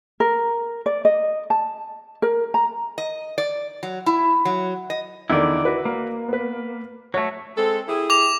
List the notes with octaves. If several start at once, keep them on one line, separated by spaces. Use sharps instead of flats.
A#4
D5
D#5
A5
A#4
A#5
D#5
D5
F#3
E4
F#3
D#5
E2 D3 D#3 E4 D5
F#4 B4
A#3
B3 B4
F#3 A3 C#5
G#3 C4 A4
E4 G4 G#4
D6 F7